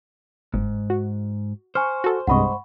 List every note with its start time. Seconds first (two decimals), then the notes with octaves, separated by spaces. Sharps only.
0.54 G1 G#2
0.90 F#4
1.75 C5 G#5 C#6 F6
2.04 F#4 A4
2.27 C2 G2 C3 G#3 D#5 F#5 B5 C#6